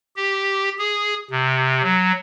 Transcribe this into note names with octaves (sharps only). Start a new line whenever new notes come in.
G4
G#4
C3
F#3